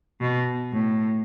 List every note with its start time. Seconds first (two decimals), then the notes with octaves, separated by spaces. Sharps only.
0.21 B2
0.72 A2